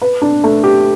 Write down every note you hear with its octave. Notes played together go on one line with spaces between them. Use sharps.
B4
D4
A3
G4